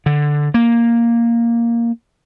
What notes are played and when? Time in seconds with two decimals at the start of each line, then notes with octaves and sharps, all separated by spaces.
0.06 D3
0.54 A#3